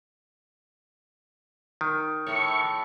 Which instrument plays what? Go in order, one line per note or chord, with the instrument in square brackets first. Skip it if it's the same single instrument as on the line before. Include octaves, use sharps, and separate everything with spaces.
[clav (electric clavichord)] D#3
[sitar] A2 A3 [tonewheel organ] C#6